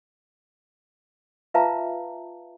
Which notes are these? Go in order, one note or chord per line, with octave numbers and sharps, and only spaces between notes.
F4 B4 E5 F5 A5 A#5